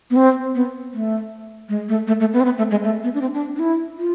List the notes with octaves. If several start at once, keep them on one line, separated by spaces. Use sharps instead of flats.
B3
C4
B3
A3
G#3
A3
A3
A3
B3
C4
B3
A3
G#3
A3
B3
D4
C4
D4
D4
E4
F4